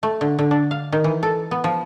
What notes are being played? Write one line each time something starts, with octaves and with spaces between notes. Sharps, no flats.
A3
D3
D3
D4
F5
D#3
E3
A4
B3
F3